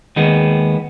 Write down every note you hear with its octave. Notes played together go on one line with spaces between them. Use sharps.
D#2 D#3 G#3 B3